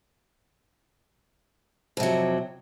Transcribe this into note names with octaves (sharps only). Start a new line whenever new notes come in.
F2 C3 F#3